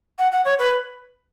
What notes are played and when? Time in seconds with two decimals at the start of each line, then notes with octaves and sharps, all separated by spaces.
0.19 F#5
0.32 F#5
0.45 C#5
0.59 B4